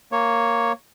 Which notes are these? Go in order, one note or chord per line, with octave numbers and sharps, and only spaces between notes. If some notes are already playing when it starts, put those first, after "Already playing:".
A#3 C#5